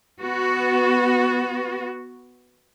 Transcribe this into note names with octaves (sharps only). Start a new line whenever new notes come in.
B3 F#4